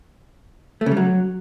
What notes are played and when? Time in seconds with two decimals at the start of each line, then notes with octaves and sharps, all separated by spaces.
0.81 A3
0.86 C#3
0.91 G3
0.97 F#3